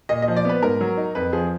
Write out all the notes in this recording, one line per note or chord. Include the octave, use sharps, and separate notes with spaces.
A#2 D#5
D#5
F3
D5
B3 B4
G#2 A#4
F#3
D#4
F2 B4
F3 G#4